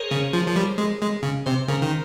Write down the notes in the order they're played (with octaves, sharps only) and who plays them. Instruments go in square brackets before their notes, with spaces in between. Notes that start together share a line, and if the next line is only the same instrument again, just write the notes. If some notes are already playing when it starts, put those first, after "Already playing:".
Already playing: [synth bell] G#4 A#4 C5 C#5
[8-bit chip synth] C#3 [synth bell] G#4
[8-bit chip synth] F3
F3
G3
G#3
G#3
C#3
[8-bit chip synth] C3 [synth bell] C5
[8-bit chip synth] C#3 [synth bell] A#4
[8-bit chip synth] D#3